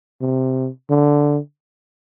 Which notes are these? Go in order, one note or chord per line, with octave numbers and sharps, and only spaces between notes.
C3
D3